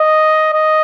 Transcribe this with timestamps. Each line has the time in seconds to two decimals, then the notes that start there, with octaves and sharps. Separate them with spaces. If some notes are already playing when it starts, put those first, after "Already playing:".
Already playing: D#5
0.53 D#5